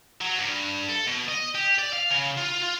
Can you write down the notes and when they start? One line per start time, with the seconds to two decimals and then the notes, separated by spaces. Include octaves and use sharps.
0.21 F#3
0.37 G2
0.89 A4
1.06 B2
1.28 D#5
1.55 G4
1.79 D5
1.93 F5
2.10 C#3
2.38 F4
2.63 F4